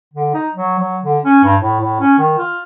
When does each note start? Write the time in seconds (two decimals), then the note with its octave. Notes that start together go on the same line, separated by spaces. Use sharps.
0.14 D3
0.34 D#4
0.55 F#3
0.79 F#3
1.04 D3
1.24 C#4
1.44 G2
1.60 A2
1.80 A2
2.00 C#4
2.19 D#3
2.38 F4